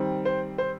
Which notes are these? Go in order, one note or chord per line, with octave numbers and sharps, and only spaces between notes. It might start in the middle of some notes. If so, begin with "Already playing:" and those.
Already playing: D#3 G3 C4
C5
C5